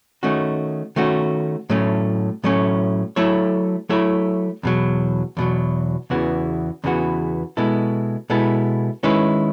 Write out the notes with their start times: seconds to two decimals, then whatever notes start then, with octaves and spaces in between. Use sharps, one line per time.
0.23 D#3 A3 C#4 F#4
0.96 D#3 A3 C#4 F#4
1.70 A2 F#3 A3 C#4
2.44 A2 F#3 A3 C#4
3.16 F#3 A3 E4 A4 C#5
3.89 F#3 A3 E4 A4 C#5
4.63 E2 B2 F#3
5.37 E2 B2 F#3
6.10 E2 C#3 E3 B3 F#4
6.84 E2 C#3 E3 B3 F#4
7.57 B2 G#3 B3 E4 A4
8.30 B2 G#3 B3 E4 A4
9.03 D#3 G#3 C#4 E4 B4